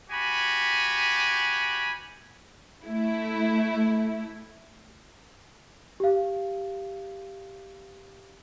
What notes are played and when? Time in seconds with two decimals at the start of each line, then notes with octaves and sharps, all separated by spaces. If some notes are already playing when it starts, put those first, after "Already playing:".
0.10 F#4 G4 G#5 B5
2.86 A3 E4
6.00 G4 F5